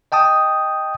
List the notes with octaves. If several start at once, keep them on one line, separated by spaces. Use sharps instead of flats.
D#5 G5 A5 D#6